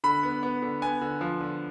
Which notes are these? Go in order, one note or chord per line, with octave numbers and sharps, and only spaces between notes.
D3 B5
B3
B3
D3
B3 G#5
D3
F3
D3